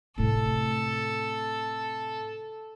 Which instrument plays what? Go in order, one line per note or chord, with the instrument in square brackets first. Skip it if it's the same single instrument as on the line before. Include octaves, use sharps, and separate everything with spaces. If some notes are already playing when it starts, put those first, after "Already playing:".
[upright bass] A2 C3 [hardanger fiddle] A4